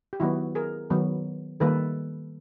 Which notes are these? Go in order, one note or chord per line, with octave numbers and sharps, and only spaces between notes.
G4
D#3 F#3 B3 E4 F#4
G#4 A#4
D#3 F#3 B3
D#3 G3 A#3 A4 B4